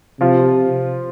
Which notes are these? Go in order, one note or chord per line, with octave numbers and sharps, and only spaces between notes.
C3 F3 F4